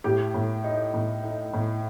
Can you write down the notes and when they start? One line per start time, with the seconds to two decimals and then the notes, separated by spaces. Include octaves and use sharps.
0.04 A2 G4
0.34 A2
0.64 D#4
0.94 A2
1.23 D#4
1.53 A2